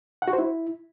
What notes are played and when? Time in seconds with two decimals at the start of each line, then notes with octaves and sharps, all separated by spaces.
0.22 F#5
0.28 F#4
0.33 C5
0.39 E4